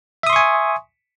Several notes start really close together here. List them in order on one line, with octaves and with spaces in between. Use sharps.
E5 D#6 C6 C#6 G#5